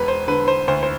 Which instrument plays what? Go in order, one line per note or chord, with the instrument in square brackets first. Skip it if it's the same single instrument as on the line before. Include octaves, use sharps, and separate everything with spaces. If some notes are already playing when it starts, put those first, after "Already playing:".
Already playing: [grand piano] E1 B4
C5
D3 B4
C5
D2 C5
C5